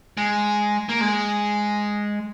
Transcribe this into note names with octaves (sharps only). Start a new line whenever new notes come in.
G#3
A#3
G#3